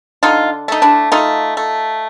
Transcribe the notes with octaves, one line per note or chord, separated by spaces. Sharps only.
D3 D#4 F4
A3 D#4
D4 E4
A3 D#4 F4
A3